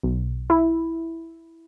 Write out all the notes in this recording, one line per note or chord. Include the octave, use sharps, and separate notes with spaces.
B1
E4